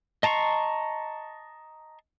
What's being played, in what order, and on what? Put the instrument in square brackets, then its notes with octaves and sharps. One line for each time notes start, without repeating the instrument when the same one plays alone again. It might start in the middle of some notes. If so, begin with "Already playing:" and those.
[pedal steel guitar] D#5 A5 A#5 C6 C#6